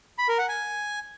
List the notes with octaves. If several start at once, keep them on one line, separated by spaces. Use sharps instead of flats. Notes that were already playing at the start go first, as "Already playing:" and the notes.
B5
A#4
F#5
G#5